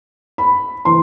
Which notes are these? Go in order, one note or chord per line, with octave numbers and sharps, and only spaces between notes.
B5
E3 C6